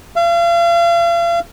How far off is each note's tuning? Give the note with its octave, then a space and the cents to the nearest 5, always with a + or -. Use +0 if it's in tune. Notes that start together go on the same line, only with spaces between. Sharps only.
F5 -40